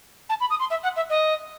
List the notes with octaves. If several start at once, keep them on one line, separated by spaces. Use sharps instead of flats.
A5
B5
D#6
C6
E5
F#5
E5
D#5